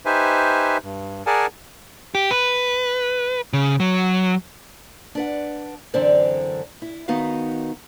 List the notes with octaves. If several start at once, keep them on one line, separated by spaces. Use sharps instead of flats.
D#4 G4 B4 C5 E5 G#5
G2
G#4 A#4 D5 F#5 G#5 A5
G4
B4
C#3
F#3
D4 B4 F#5
F#2 D3 E3 C4 C5 D5
E4
D#3 B3 D#4 F#4 B4 F5